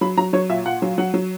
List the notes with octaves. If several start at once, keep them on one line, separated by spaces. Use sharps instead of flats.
F#3 B5
F#3 A#5
F#3 C#5
A#2 E5
A#2 F#5
F#3
F#3 F#5
F#3